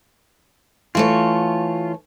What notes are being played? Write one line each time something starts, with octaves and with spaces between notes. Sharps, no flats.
E3 A3 F4 C#5